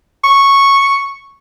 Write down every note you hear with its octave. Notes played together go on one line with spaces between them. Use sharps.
C#6